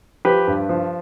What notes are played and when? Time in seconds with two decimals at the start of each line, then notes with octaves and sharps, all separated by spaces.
0.25 F3 G4 B4
0.47 G2
0.69 F3